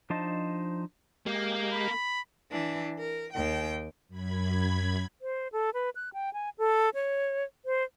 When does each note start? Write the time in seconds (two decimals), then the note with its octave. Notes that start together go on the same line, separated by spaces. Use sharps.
0.10 F3 D4 D#4 C5 D#5 A5
1.26 G#3 A#3 G4
1.73 B5
2.51 E3 D4
2.99 A#4
3.33 D#2 G5
4.08 F#2 B5 G#6
5.22 C5
5.52 A4
5.74 B4
5.96 F#6
6.14 G5
6.33 G#5
6.58 A4
6.94 C#5
7.65 C5